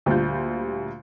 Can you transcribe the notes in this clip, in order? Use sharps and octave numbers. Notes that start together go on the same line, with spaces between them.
D2 A#2 G3 F4 G6